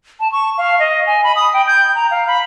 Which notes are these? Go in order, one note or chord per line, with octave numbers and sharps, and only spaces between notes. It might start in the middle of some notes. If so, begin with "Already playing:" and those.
A5
C#6
F5
D#5
G#5
B5
D#6
G5
G6
A#5
F5
B5